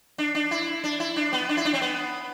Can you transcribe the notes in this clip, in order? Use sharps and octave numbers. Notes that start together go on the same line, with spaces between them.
D4
D4
E4
D4
E4
D4
B3
D4
E4
D4
C4
B3